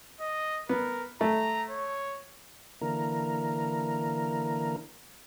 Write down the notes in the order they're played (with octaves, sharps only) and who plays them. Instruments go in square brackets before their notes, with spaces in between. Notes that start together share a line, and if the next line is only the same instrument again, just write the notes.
[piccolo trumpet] D#5
[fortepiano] B3 [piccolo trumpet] A#4
[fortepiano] A3 [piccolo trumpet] A#5
[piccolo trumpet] C#5
[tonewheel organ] D3 E3 A#3 A#4